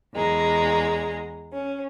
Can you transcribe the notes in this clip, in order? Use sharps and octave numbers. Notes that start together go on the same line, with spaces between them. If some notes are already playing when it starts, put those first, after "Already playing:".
E2 G#3 A#5
C#4